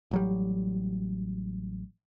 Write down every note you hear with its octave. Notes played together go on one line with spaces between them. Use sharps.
A1 F#3 G3